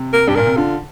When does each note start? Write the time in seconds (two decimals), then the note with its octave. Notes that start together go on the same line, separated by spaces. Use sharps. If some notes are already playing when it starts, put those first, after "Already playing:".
Already playing: C3
0.13 A#4
0.27 G2 G4
0.35 A#2 A#4
0.46 C3
0.57 D3 F4